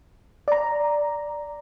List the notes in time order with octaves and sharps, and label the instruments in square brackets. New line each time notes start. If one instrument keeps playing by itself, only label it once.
[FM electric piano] D5 A#5